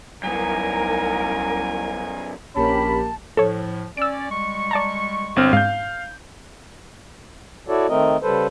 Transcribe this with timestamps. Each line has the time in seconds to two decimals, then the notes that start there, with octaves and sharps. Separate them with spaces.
0.23 C2 F#2 B3 A#4 G#5
2.56 A#1 A#3 C#4 G4 A5 B5
3.37 A2 F3 A4 C#5
3.97 C#4 D5 E6 D7
4.30 G3 G#3 C#6
4.71 D5 A5 A#5
5.36 G1 C4 F6
5.53 G#2 F5 G6
7.68 E4 F#4 A4 C#5 D5
7.89 D#3 A3 C4 A#4 D#5
8.22 C#3 G3 A4 B4 C5